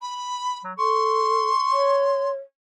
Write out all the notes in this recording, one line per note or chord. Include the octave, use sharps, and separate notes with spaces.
B5
F#3
A4 C6 C#6
C#5